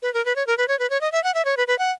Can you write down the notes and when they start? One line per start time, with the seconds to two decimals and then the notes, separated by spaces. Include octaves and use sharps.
0.02 B4
0.14 A#4
0.25 B4
0.36 C#5
0.47 A#4
0.58 B4
0.68 C#5
0.79 B4
0.90 C#5
1.01 D#5
1.12 E5
1.24 F#5
1.34 E5
1.45 C#5
1.57 B4
1.67 B4
1.79 F#5